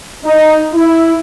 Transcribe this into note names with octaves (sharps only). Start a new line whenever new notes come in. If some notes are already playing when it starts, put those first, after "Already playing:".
D#4
E4